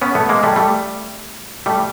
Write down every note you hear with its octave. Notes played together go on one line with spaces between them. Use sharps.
B3 C#4
A3 B3
G#3 A#3
G3 A3
G3 A3
G3 A3